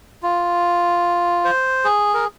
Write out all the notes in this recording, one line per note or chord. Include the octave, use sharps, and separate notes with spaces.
F4
C5
G#4
A#4